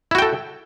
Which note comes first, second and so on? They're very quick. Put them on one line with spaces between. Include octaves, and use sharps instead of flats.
E4 F#4 G5 A4